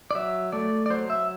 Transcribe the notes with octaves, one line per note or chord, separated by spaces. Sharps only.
D5
F#3 E5
A3 D5
D5
F#3 C5
E5